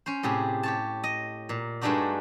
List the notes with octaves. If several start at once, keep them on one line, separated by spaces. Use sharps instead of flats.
C#4 C5
A2 C3 G4 G#4
G4 C#5 A5
D#5
A#2
G2 G#3 A3 D4 D#4 F#4